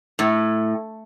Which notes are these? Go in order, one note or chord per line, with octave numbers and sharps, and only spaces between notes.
A2